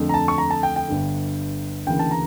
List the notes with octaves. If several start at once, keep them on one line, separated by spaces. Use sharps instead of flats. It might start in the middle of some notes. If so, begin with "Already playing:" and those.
Already playing: F2 D3 A3
A#5
A5
C#6
A#5
A5
G5
G5
G1 G2 D3
D2 C#3 E3 A#3 G5
A5
A#5